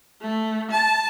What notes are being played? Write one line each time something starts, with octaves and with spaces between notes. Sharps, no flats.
A3
A5